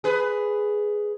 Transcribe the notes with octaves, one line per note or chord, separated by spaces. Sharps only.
G#4 B4